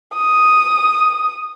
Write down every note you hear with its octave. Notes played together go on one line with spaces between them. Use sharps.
D#6